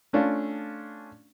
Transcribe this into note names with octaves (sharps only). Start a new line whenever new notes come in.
A3 C#4 D4 F4